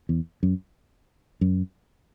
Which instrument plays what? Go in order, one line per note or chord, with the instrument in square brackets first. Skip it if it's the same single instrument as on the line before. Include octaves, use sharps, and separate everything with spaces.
[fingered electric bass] E2
F#2
F#2